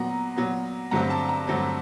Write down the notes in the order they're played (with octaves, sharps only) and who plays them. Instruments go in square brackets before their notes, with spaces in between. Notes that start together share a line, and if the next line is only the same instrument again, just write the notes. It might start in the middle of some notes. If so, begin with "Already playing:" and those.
Already playing: [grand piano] A#2 F#3 B3 A#5
A#2 F#3 B3
G2 D3 F#3 A3 C4 A#5
A5
A#5
G2 D3 F#3 A3 C4